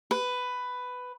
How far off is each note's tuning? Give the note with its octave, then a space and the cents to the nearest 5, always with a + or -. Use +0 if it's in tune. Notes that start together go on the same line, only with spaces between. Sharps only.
B4 +10